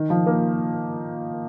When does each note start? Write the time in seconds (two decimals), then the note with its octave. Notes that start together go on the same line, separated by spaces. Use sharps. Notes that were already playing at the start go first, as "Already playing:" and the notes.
Already playing: D#3
0.10 F3
0.26 A#3